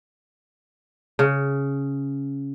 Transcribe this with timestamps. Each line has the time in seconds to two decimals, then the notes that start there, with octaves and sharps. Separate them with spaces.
1.19 C#3